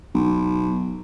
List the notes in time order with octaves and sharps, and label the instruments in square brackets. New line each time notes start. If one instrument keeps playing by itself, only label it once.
[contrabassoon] B1